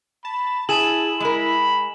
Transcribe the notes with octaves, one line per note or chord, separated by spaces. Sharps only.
A5 B5
E4 G#4 G#5 A5 E7 F#7
G#3 A#4 B5